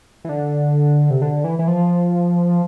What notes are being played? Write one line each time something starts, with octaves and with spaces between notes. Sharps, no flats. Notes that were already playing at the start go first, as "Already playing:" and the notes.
E3
D3
C3
D3
E3
E3
F3